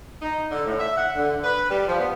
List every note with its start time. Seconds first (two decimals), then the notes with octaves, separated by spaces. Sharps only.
0.22 D#4
0.51 D3
0.66 A2
0.80 E5
0.97 F#5
1.16 D3
1.43 B4
1.69 G3
1.88 F3
2.00 B3